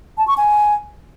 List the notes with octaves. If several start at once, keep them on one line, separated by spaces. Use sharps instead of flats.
A5
C#6
G#5